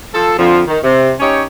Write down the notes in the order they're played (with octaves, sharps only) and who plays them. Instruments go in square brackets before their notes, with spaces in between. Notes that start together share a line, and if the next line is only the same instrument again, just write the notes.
[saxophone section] F3 A4
F2 D3 F3
D#3
C3
C#4 D#4 G4 C#5